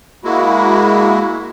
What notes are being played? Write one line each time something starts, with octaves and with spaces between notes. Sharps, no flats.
G#3 A#3 E4 F#4